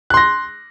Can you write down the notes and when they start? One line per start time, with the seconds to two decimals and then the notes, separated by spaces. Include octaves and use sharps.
0.10 F#6
0.14 C6
0.17 A#6